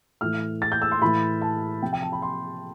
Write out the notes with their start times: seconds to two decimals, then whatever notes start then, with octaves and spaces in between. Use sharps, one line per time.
0.21 A2 E3 F6
0.62 A6
0.72 G6
0.82 E6
0.92 C6
1.02 A2 E3 B5
1.42 A5
1.82 C3 F3 G5
1.93 G5
2.02 A5
2.12 B5
2.22 C6